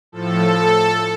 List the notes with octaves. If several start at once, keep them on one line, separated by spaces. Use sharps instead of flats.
A2 F3 A4